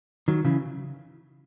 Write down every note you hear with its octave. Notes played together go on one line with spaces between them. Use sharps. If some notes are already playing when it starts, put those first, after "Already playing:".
D#3 F#3
C#3 E3